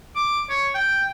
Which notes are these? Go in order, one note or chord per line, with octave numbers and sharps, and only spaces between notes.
D6
C#5
G5